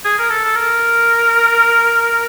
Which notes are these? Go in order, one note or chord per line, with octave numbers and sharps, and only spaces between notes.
G#4
A#4
A4
A4
A#4